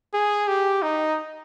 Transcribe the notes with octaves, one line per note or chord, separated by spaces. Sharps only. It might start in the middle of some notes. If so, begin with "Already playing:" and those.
G#4
G4
D#4